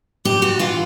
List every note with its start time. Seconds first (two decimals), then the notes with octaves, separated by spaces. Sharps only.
0.25 G2 G4
0.42 G2 F#4
0.59 E3 F4